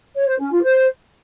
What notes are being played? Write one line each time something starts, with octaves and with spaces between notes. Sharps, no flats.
C#5
C5
C#4
F4
C5